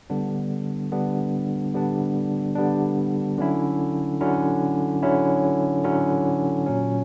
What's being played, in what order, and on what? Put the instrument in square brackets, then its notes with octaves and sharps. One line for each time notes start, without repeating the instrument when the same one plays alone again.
[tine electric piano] D3 G3 B3 D4
D3 G3 B3 D4
D3 G3 B3 D4
D3 G3 B3 D4
D3 F#3 C#4 E4
D3 F#3 C#4 E4
D3 F#3 C#4 E4
D3 F#3 C#4 E4
A#2 F#3 C#4